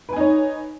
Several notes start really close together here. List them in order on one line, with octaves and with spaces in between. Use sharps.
B4 G#5 D#4 C#5